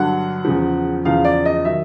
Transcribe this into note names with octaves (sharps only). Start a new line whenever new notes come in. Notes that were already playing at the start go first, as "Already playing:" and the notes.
Already playing: G2 D3 F#3 F#5
E2 C#3 F3
E2 C#3 F3 F5
D5
D#5
D#3 F#3 E5